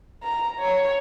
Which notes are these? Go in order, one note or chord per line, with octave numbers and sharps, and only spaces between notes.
A#5
C#5